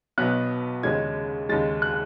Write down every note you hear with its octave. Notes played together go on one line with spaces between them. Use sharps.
B1 B2 F#3 B3 F#6
D#2 C#3 G#3 C#4 G#6
D#2 C#3 G#3 A6
F#6